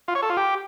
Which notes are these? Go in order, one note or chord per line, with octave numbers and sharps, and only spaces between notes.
F4
C#5
A4
F4
G4